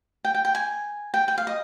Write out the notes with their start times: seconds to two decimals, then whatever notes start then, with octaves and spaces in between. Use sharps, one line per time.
0.25 G5
0.35 G5
0.45 G5
0.55 G#5
1.14 G5
1.28 G5
1.38 F5
1.47 D#5